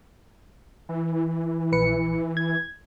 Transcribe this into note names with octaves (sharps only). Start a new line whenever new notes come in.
E3
A#1 B4 C#7
G#6